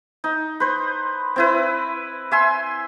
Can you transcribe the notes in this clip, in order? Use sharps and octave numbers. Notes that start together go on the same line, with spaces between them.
D#4
B4 C5
C4 E4 B4
E5 G#5 C6